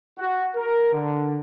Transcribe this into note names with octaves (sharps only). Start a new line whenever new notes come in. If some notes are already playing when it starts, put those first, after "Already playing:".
F#4
A#4
D3